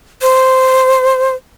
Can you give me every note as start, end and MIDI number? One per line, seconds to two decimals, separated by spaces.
0.22 1.34 72